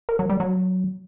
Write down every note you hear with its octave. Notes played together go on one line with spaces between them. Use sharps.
A#4
F#3
G3
F#3